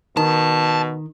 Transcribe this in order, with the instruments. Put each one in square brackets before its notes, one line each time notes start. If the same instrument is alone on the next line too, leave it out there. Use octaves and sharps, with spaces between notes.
[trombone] B2 [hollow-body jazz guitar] D#3 [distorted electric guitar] A5